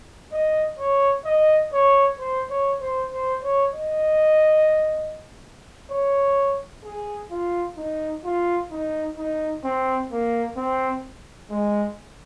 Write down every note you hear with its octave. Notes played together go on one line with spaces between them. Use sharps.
D#5
C#5
D#5
C#5
C5
C#5
C5
C5
C#5
D#5
C#5
G#4
F4
D#4
F4
D#4
D#4
C4
A#3
C4
G#3